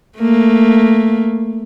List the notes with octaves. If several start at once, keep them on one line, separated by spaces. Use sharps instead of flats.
A3 A#3